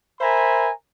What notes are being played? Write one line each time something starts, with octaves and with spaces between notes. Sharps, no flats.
A#4 C5 E5 G#5 A#5 B5